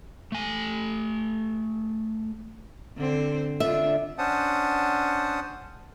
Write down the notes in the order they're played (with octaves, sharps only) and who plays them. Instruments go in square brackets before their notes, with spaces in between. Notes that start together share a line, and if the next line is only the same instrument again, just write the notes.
[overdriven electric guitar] A3 G#5
[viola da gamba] D3 C4 C5
[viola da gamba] D3 D4 F4 [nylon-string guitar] E5
[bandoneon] C#4 D4 C5 F#5 A5 D#6